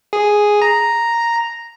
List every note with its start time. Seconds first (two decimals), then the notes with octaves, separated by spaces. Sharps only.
0.13 G#4
0.62 A#5